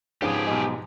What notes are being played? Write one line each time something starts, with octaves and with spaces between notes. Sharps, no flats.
G#2 C#3 F3 B3 G4 G#4
B1 G#3